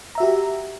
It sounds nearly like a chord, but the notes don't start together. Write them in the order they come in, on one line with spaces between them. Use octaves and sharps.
A#5 E5 F#4 G4